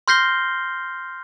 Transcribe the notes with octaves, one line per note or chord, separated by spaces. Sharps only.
C6 F6 G6 A#6 C7 G7